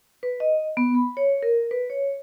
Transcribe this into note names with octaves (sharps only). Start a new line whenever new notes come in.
B4
D#5
B3
B5
C#5
A#4
B4
C#5